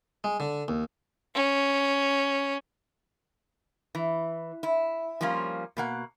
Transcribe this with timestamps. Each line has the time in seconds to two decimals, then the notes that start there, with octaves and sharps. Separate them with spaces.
0.24 G#3
0.40 D3
0.68 D#2
1.34 C#4
3.95 E3
4.63 E4
5.21 F3 G3 A#3 C#4 F4
5.77 B2 A#3 F#5